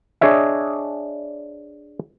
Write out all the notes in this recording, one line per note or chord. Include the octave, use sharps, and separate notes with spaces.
D4 G#4 C#5 D#5 E5